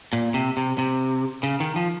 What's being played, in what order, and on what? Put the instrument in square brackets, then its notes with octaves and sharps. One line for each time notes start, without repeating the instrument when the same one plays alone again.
[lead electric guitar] A#2
C3
C3
C3
C#3
D#3
F3